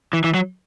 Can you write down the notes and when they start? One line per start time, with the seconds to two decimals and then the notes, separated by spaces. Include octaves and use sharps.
0.13 E3
0.24 E3
0.34 F#3